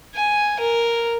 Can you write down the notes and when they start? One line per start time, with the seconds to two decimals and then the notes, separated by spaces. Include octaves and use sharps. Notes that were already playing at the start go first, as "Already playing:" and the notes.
0.15 G#5
0.60 A#4